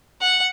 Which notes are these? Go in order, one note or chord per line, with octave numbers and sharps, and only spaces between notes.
F#5